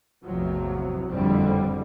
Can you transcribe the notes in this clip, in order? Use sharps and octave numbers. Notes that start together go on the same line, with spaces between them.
A1 E2 C3 F3 F#3
F#1 F2 A2 D3 G3 C4